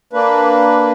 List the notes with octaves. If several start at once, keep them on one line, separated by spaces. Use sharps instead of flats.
A#3 D4 B4